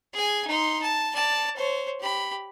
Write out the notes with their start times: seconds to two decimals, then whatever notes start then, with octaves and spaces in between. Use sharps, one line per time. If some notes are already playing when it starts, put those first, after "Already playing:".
0.14 G#4 G#5
0.47 D#4 C6
0.82 A5
1.15 D5 A5
1.56 C5 C#5
2.00 G4 B5